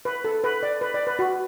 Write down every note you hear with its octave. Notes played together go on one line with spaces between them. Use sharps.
B4
A4
B4
D5
B4
D5
B4
F#4